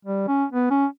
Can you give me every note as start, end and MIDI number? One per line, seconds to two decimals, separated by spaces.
0.05 0.24 55
0.28 0.45 61
0.52 0.69 59
0.71 0.86 61